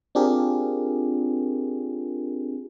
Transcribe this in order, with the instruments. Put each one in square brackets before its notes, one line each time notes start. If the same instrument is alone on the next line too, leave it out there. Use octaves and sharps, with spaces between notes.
[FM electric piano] C4 D4 F4 G4 G#4 A#4